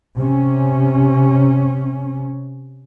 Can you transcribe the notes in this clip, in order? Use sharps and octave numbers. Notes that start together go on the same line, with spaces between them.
C3 C#4